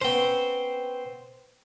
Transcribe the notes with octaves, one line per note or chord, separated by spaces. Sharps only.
B3 C#4 C5 G5